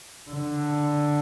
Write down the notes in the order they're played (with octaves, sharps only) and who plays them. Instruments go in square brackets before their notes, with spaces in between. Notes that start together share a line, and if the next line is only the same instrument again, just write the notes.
[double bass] D3